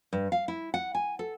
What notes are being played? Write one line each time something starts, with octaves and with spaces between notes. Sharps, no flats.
G2
F5
E4
F#5
G#5
A4